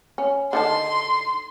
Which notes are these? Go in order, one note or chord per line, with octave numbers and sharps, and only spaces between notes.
C#4
D3 D#3 A5 C6